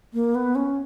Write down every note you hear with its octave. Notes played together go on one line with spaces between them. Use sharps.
A#3
B3
C#4